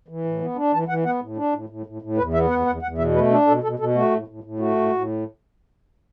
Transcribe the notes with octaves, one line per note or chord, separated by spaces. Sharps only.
E3
A2
B3
D4
E3 A5
E3 F#5
B3 F#5
A2
D4
A2
A2
A2
A2
E2 B4
B3 E5
E2 F#5
E2 F#5
E2 F#5
B2 E5
A3 B4
D4 A4
B2 A4
B2 A4
B2 A4
A3 F#4
A2
A2
A2
A3 F#4
A2
A2